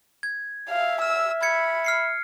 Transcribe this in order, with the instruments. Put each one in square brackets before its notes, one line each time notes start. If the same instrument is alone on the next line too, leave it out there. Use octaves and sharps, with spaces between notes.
[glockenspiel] G#6
[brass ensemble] E5 [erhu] F5
[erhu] E6 [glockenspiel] F6
[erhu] B5 [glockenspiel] G#6 C#7
[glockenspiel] F6 C7 C#7